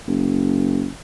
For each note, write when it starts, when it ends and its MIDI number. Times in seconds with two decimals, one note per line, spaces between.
0.07 0.88 30